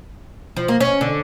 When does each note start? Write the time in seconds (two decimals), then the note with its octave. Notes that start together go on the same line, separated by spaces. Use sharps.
0.57 F3
0.68 A#3
0.80 C#4
1.01 D3